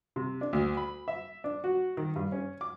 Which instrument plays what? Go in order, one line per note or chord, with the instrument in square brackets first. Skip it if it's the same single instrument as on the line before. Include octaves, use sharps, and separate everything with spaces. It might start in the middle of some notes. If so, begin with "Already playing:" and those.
[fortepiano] C3
D4
D2
B5
E5
D4
F#4
D#3
G2
C#4
D6